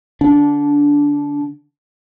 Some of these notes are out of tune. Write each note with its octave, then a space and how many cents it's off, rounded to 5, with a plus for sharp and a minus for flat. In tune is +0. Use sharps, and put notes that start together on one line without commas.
D3 -10 D4 -20